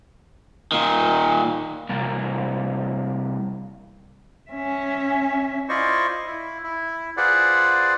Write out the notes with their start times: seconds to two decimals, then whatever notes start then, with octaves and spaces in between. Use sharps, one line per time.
0.72 A#2 D#3
1.89 C2 A#3
4.51 C#4 E5
5.69 E4 F4 C5 D5 D#5 C#6
6.26 E4
6.64 E4
7.17 F4 G#4 B4 C5 D5 F#5